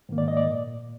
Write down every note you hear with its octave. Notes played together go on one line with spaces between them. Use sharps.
G#2 D#3 A#3
D5
D#5
D5
A#2